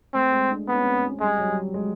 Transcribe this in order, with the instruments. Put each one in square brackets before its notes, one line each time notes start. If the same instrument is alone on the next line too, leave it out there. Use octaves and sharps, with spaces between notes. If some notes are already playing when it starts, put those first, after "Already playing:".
[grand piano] A3 [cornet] C4
[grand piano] G#3
D4
[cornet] B3 [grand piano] C4
[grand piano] C#4
C4
C#4
C4
C#4
C4
[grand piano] G3 [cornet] G#3
[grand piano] F#3
G3
G#3